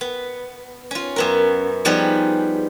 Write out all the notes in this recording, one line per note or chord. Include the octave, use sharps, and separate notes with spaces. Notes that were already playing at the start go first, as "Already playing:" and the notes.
B3
C#4 F4
F#2 B3 A#4
F3 G3 B3 D#4 G#4